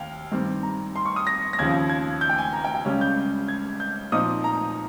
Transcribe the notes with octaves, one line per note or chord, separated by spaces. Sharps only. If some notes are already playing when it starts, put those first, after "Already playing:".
Already playing: D#2 F5 G5
G2 D#3 G3 C4
A#5
C6
C#6
D#6
A#6
A#6
D#2 C#3 F3 G#6
G#6
G6
G5
G#5
A#5
G5
G5
C#2 C#3 G3 C#4
G6
G#6
G6
A#2 F3 C4 D#4 D#6
A#5